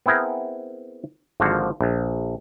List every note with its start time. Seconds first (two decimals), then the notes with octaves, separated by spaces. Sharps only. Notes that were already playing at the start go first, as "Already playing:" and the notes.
0.06 B3 C4 E4 G#4 A#4
1.40 G#1 D3 F3 A#3 F#4 F5
1.81 A#1